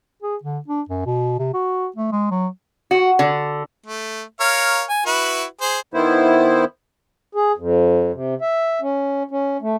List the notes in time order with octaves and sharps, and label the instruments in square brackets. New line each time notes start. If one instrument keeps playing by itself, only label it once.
[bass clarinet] G#4
D3
D4
F#2
B2
C3
F#4
A3
G#3
F#3
[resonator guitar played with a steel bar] F#4
D3
[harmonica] A3
A#4 C#5 F5
G#5
E4 F#4 B4
G#4 C5
[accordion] D#3 B3 E4 C5
[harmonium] G#4
F2
C3
E5
C#4
C#4
A3